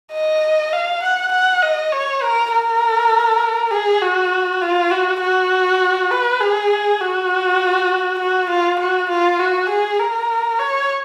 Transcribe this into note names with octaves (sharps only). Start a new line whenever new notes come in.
D#5
F5
F#5
F#5
D#5
C#5
A#4
A#4
G#4
F#4
F4
F#4
F#4
B4
G#4
F#4
F#4
F4
F#4
F4
F#4
G#4
A#4
C#5